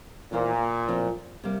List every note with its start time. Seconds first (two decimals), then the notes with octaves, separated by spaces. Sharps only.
0.31 E2 A#2 E3 A#3 F4 C5
0.88 A2 F3 C4 F4
1.44 C3 G3 A#3